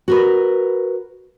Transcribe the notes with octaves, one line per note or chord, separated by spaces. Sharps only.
F#4 A#4 B4